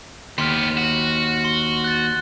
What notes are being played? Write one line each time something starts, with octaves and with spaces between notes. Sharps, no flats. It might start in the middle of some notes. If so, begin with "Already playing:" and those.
D#2 B3 G4 C6 F6
F#4
C6 G7
F#6 A6